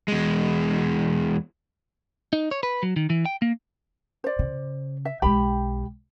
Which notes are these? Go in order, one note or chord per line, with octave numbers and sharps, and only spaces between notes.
E2 G#3
D#4
C#5
B4
F#3
D#3
E3
G5
A#3
C5 D5
C#3
E5
B1 G#3 G4 G5 B5